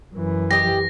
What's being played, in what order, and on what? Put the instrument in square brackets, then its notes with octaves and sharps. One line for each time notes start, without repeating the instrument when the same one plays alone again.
[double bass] F#2 E3
[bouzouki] G4 D#5 [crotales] A#6